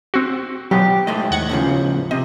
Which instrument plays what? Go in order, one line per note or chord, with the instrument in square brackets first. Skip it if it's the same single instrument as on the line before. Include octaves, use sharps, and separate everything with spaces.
[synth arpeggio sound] C4 F#4
[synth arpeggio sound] B2 F3 F#3 [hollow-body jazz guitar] G4
[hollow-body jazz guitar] G#2 A3 D#5
[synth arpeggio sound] D#2 F#5 G#6
[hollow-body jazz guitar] A2 C#3 F3
[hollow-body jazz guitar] C3 [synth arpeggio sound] D#5